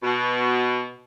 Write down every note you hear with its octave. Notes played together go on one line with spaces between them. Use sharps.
B2